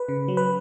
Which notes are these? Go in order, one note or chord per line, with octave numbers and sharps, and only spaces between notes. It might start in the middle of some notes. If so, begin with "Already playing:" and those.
Already playing: B4
C#3
F#3
B4